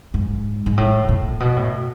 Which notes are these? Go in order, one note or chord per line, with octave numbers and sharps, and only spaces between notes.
G#2
G#2
A2
A#2
B2
A2